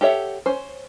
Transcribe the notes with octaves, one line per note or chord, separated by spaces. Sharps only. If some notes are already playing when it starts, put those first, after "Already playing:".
G4 A4 C#5 E5 F#5
C#4 C5